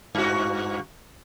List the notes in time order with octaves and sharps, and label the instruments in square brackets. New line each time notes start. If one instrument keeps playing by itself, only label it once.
[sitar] G2 F#4